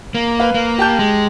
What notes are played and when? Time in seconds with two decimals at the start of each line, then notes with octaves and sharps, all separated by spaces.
0.15 A#3
0.39 B4 F5
0.54 A#3
0.78 G4 A5 G6
0.99 G#3